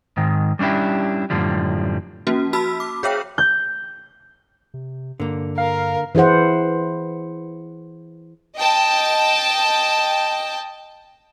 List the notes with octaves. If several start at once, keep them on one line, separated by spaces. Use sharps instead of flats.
G#2 D#3
G3 C#4 D4 E4 G4
F#2 A2 D3 F3 G3
F3 A#3 C#4 F#4
F#4 A5 B5 E6 B6
D6
G#4 C5 C#5 E5 F5 G5
G6
C3
G2 D3 A#3
A#4 F5
E3 E4 G#4 C5 F#5
D#5 G5 A5